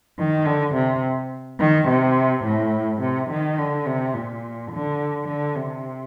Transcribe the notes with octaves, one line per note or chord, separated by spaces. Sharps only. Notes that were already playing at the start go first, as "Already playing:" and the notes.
D#3
D3
C3
D#3
C3
A2
C3
D#3
D3
C3
A#2
D3
D3
C3